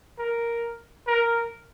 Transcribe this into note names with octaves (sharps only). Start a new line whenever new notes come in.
A#4
A#4